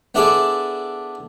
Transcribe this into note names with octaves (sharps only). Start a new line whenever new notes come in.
B3 D4 E4 G#4 A4 D5